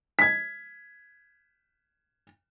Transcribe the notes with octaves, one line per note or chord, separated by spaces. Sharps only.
G#6 B6